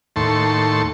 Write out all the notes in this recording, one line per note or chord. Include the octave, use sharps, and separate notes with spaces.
D#2 A2 A5 C6 C#6